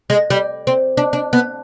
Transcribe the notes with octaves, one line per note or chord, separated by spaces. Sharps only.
G#3
G3
C4
D4
D4
B3